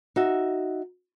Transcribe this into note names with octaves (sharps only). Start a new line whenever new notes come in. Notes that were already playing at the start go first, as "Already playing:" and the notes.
D#4 F#4 E5